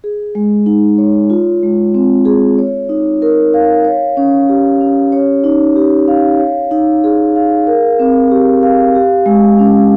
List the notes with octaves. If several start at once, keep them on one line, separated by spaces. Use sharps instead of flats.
G#4
G#3
D#4
C#5
F4
G#3
C4
G#4
C#5
D#4
A#4
F5
C#5
C#4
G4
C#4
C#5
D#4
G4
F5
C#5
D#4
G#4
F5
A#4
C4
G4
F5
G4
G#3
C#4